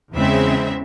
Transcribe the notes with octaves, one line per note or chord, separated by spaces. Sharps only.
E2 C#3 G#3 C4 E5